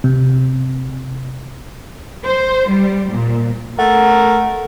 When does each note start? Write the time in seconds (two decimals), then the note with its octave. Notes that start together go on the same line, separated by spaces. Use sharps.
0.04 C3
2.26 C5
2.70 G3
3.12 A#2
3.79 A3 A#4 F#5